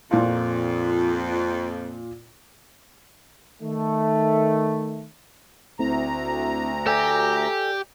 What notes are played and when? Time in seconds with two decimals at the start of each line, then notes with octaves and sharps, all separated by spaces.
0.11 F2 A#2 F4
3.62 D#3 A3
5.79 D2 A3 C4 E4 A#5
6.87 G4 A4 D5 G#5